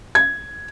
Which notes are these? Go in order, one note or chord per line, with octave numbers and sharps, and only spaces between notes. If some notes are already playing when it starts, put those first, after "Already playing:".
G#6